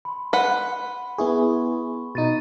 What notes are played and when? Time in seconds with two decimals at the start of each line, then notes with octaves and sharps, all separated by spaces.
0.05 B5 C6
0.33 B4 F#5 B5 G7
1.18 B3 E4 G#4 C#6
2.15 B2 D#4 A6 D#7